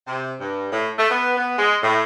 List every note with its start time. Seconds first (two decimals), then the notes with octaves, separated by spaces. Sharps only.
0.07 C3
0.40 G2
0.71 A2
0.98 A3
1.09 B3
1.37 B3
1.57 G#3
1.82 A2